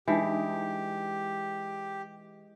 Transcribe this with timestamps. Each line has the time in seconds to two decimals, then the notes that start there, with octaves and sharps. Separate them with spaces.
0.08 E3 G#3 D4 D#4 G4